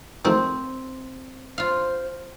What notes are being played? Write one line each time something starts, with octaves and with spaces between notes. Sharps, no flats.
D#3 F3 A3 C4
F4 C5 F5